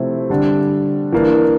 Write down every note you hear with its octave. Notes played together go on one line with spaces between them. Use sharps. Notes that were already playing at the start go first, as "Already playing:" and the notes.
Already playing: C3 F3 A3 C4 E4
D3 G3 D4
E3 A#3 D4